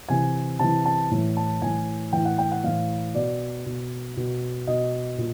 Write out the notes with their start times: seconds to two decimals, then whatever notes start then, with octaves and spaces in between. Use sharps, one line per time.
0.08 C3 E3 G#5
0.59 C3 E3 A5
0.85 A5
1.11 A2 E3
1.37 A5
1.62 A2 E3 G#5
2.13 A2 E3 G5
2.25 F#5
2.38 G5
2.51 F#5
2.64 A2 E3 F5
3.14 B2 D5
3.66 B2
4.17 B2
4.67 B2 D#5
5.18 A#2